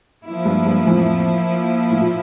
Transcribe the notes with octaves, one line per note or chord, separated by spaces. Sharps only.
F3 A#3 E4
G2
G2
F2 A2
A2
A#2